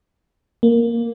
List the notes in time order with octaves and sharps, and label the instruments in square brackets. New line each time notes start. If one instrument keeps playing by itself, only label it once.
[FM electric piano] A#3